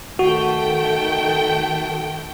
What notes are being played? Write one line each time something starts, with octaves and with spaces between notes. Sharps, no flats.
D#3 A3 F#4 G5